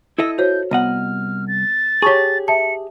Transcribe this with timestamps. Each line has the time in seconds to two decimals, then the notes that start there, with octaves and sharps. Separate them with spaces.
0.18 E4 A4 D#5 E6
0.38 F#4 C5 C#5 G6
0.71 C2 B3 D#5 F#5 F6
1.48 A6
2.02 G4 G#4 C#5 A5 C#6
2.48 E5 A5 C#7